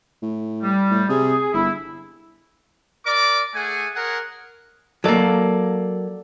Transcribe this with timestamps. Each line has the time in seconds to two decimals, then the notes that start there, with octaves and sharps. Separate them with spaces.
0.22 A2
0.63 G3
0.91 A2
1.09 C3 G#4
1.53 G1 E4
3.06 A#4 D5 D6
3.55 A3 G#4 F#5 G#5
3.96 G#4 A#4 C#5 F#5
5.04 F#3 A#3 A4 D5